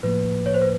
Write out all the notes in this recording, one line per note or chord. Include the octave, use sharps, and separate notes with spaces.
A2 F3 A#3 B4
C#5
C5
B4